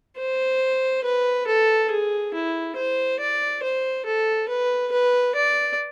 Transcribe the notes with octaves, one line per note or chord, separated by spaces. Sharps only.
C5
B4
A4
G#4
E4
C5
D5
C5
A4
B4
B4
D5